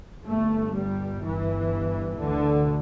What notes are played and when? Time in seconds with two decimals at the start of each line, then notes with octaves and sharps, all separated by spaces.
0.25 G1 G2 A3
0.74 G3
1.22 G1 G2 E3
2.20 D2 D3